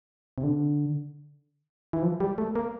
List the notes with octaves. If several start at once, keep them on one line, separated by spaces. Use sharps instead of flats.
C3
D3
E3
F3
G3
A3
A#3